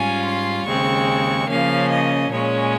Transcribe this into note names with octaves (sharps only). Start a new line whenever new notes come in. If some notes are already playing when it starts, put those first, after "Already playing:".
Already playing: G#2 G3 C#4 F4 G#5
C6
D#2 C#3 G#3 C4 C#6
C#3 F3 A#3 C#4 F5
D#5
A#2 G#3 C#4 C#5